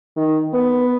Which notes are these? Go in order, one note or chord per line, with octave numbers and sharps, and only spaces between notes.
D#3
B3